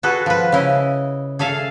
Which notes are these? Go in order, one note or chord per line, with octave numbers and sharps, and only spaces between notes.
F#4 G#4 A4 B4
F3 B4
C#3 E4 D#5
G#4 A4 E5 F5